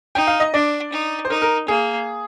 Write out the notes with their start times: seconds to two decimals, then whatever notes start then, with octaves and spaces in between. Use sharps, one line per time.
0.15 D#4 G5
0.27 F5
0.40 D#5
0.54 D4 D5
0.92 D#4
1.25 C5
1.30 D#4 A#4
1.42 A#4
1.68 A#3 G#4